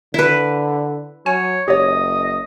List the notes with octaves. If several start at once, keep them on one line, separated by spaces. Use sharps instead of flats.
D3 E4 B4
F#3 C#5 G#5
F#1 G4 C#5 D#5